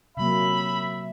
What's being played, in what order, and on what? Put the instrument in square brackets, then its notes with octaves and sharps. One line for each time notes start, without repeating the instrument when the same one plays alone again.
[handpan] C3 F#3 A#3 [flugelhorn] E5 [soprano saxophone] B5